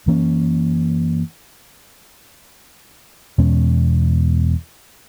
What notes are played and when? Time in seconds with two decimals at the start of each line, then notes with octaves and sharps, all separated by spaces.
0.06 F#2 E3 A#3 C#4
3.38 E2 B2 G#3 C#4